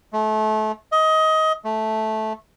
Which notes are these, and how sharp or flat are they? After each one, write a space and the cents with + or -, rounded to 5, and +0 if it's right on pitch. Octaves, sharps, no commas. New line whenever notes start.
A3 -30
D#5 +20
A3 -10